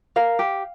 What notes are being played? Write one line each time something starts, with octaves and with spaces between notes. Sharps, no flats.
A#4 F5
G4